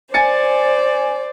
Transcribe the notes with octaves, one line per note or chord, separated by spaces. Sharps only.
C5 D5 G#5 A6 C#7